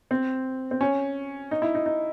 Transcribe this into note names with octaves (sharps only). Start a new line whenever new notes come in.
C4
C4
C#4
D#4
E4
D#4
D#4